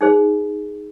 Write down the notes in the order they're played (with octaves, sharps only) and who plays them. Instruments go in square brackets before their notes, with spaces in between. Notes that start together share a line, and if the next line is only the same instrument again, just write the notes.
[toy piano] D#4 G#4 C5